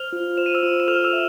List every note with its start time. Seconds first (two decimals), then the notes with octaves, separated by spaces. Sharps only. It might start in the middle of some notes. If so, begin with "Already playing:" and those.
Already playing: C5 F6 F7
0.13 F4
0.37 C5 E7
0.46 D#7
0.55 E6 E7
0.63 F4
0.80 E7
0.88 A4 F6 F7
1.04 E6 E7
1.13 E5